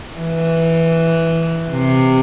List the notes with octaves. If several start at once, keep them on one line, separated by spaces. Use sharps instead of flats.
E3
C3